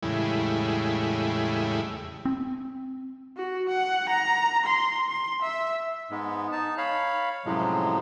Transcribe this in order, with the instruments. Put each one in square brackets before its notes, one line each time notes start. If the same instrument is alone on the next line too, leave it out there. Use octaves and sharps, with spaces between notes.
[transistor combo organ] E2 A2 C#3 G3 G#3 E4
[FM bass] C4
[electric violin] F#4
F#5
A#5
C6
C6
E5
[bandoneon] G#2 G#3 B3
D#4 A5
C#5 F5 B5
F#2 A2 C3 F3 F#3 G#3